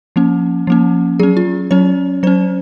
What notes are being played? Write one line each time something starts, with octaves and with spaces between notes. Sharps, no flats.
F3 A#3 C#4
F3 A#3 C#4
F#3 C#4 G#4
F4
F#3 C#4 C#5
F#3 C#4 C5